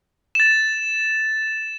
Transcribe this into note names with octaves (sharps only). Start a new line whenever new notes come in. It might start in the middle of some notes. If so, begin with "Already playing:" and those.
A6 E7